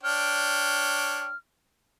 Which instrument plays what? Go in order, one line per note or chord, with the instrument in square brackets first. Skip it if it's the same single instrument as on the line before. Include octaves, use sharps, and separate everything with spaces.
[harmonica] D4 C#5 G5 [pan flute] F6